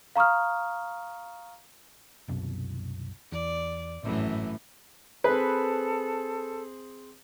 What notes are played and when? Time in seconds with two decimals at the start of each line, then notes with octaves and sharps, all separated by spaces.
0.16 F5 A#5 C#6 D#6 F6
2.28 C2 F#2 B2
3.32 E2 D5
4.04 G#1 F#2 A2 E3
5.24 C4 G#4 A4 B4